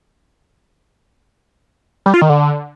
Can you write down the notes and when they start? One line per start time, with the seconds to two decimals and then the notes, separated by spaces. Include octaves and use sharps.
2.06 G3
2.14 F4
2.22 D#3
2.29 D3